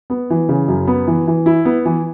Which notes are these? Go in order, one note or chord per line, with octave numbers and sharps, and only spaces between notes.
B3
E3
C#3
F#2
B3
E3
E3
E4
B3
E3